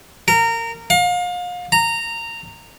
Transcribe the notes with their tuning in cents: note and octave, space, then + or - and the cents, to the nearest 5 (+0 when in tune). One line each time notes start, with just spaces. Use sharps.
A#4 -20
F5 +35
A#5 -15